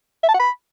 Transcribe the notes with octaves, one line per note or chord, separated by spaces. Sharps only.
E5
A5
F#5
B5